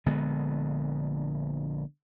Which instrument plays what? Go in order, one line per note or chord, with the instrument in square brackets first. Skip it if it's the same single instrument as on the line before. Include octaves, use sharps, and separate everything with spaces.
[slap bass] A#1 D3 G#3 B3